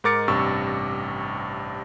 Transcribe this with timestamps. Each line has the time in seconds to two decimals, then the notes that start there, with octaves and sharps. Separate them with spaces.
0.04 G#2 D#4 A#4 D6 A6 C#7
0.28 A1 G2 C3 C#6 E6